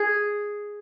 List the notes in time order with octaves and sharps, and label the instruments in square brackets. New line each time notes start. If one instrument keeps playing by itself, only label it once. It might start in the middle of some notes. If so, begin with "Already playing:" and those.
Already playing: [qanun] G#4